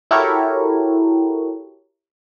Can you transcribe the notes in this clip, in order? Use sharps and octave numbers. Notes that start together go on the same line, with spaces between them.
E4 F#4 G4 A4 A#4 C#5